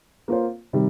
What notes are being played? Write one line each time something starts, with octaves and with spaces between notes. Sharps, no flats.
A#3 F4 C5
C3 D#3 G3